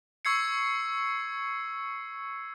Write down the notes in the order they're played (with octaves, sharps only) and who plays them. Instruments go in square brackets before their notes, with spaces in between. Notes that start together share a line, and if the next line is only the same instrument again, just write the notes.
[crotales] C#6 E6 G#6 C7 C#7